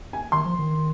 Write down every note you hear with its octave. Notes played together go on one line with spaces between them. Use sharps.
G#5
D#3 C6
F3
D#3